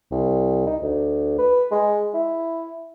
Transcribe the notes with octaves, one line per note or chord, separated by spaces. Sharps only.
C2
D#4
D2
B4
G#3
E4